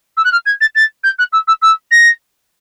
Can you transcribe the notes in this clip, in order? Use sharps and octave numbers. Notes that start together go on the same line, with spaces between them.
E6
F#6
F6
G#6
A6
A6
G6
F#6
E6
E6
E6
A#6